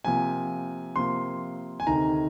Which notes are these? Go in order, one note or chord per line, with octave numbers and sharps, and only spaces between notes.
C3 F3 A#3 G#5
C3 F3 A#3 C6
G#5
D2 C3 D#3 A#5